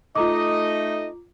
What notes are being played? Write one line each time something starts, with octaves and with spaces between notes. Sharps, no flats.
A3 D#4 F4 D#5 A#5 D6